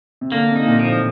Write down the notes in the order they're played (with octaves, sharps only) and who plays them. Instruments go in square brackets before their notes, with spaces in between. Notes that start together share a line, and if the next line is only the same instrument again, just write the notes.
[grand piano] C3
[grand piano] D3 [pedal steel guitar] A#3
[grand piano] C3
[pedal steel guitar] D#4
[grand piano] A#2
[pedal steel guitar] F3
[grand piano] A2